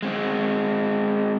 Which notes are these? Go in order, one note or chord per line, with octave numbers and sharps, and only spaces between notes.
G#3 C4